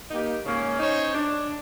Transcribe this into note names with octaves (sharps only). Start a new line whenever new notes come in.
A#3 D#4 G4
G#2 C#3 A#3 C#4
C#4 D#4 C5 C#5
D4